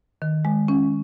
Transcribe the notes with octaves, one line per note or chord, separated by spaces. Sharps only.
D#3
G#3
C#4